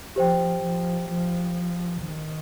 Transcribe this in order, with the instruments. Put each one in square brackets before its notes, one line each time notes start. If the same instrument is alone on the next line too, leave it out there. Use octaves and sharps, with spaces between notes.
[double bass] F3 [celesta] G4 C5 G5
[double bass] F3
F3
D#3